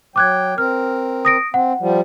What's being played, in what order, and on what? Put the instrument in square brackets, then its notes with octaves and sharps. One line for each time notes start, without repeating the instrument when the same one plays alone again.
[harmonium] F#3 G5 [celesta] D6 F#6 G#6
[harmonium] C4 A#4 [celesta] F6
[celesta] D#6 A#6 D7
[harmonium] C4 [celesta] F#5
[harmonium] F3 G3